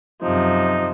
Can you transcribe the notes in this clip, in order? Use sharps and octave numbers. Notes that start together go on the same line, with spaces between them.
F#2 C3 F3 D#4